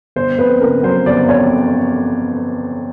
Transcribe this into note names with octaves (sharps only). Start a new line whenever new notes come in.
G1 C5
F2 B4
C#3 A#4
F#3 C5
G1 D5
F2 C#5